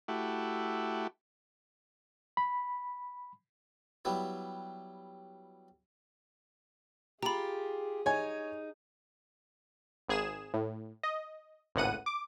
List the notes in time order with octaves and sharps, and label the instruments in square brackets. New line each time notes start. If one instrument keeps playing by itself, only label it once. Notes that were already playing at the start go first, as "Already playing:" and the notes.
[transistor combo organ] A3 E4 F#4 G4
[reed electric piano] B5
[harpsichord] F#3 G3 B3 E4
[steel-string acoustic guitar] F4 G4 [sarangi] G#4 [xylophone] A#5 B5
[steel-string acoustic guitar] D#4 [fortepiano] C#5 G#5
[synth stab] G#1 G#4 E7
A2
D#5
G#1 C#2 A2 F#5 D#7
D6